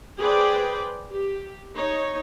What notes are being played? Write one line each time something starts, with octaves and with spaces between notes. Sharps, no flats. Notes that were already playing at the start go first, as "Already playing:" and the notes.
G#4 B4 C5 D5 G5
G4
D#4 C#5